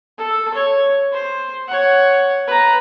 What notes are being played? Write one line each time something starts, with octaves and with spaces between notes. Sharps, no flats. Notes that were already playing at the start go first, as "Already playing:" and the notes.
A4
C#5
C5
C#5 F#5
B4 A#5